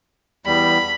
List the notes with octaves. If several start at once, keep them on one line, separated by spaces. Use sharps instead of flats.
E2 G3 B5